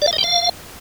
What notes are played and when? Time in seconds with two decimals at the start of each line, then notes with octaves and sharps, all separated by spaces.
0.02 D5
0.07 F5
0.13 D#5
0.18 G5
0.24 F5